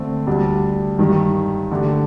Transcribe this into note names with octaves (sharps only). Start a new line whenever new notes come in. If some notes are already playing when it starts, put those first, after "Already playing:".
Already playing: D3 A3 C4
D2 D3 G3 D4
G2 D#3 G3
D3 A3 D4 G4